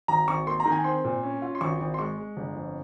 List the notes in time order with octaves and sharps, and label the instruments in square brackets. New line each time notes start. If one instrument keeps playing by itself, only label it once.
[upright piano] G#1 [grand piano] A#5
[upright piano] G#1 [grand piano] C#6
[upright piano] A#3 [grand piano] C6
[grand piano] A#5
[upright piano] D#3
[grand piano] G#5
[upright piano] C4 [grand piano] C6
[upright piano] A#2
C#4
F4
[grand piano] C6
[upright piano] G#1 [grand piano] C#6
[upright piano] G#1
[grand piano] C6
[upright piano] G#3 [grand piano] C#6
[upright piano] G#3
G1
F2